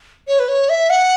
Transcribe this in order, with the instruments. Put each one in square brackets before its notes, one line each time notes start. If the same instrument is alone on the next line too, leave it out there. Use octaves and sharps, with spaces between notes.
[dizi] C#5
B4
C#5
E5
F#5